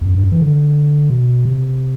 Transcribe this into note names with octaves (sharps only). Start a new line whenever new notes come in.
E2
F#2
G2
F#2
E3
D3
B2
C3